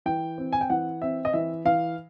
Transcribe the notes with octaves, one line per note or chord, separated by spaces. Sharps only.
E3 G5
C4
G#5
G5
E3 F#5
C4 E5
D#5
E3 E5
E3 F5